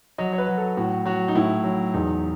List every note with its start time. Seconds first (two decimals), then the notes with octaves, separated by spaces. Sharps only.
0.18 F#3 D#5
0.33 C#5
0.38 B4
0.47 F#3
0.58 A4
0.77 A2 F#4
1.06 F#3 F#4
1.28 D#4
1.35 A2 E4
1.64 F#3
1.94 E2 D#4